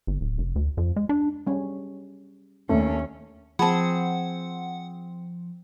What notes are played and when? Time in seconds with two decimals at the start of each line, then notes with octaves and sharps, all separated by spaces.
0.07 G1
0.21 D1
0.38 F1
0.56 D2
0.77 F2
0.96 G#3
1.09 D4
1.47 G3 C#4
2.69 D#2 A3 C#4 D4
3.59 F3 C4 G#4 F#5 A5 B5